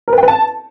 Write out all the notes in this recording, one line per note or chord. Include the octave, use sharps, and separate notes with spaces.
A#4
B4
G5
B4
A5